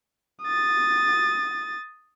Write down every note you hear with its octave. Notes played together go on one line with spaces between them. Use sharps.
D#6 A6